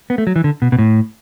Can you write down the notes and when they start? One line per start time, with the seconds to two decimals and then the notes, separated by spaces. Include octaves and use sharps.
0.10 B3
0.18 A3
0.27 F#3
0.36 E3
0.44 D3
0.62 B2
0.72 B2
0.79 A2